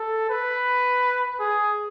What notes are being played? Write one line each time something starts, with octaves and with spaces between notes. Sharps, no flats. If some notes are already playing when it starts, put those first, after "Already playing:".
Already playing: A4
B4
G#4